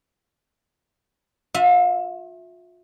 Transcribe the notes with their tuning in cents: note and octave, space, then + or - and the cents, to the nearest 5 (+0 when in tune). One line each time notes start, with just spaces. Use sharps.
F4 +40 E5 +0